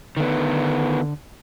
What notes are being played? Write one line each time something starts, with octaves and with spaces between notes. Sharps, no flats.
D3 D#3 B3